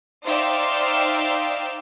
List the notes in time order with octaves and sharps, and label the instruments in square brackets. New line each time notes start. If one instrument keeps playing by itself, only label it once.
[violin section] D#4 C5 D5 E5 F5 G5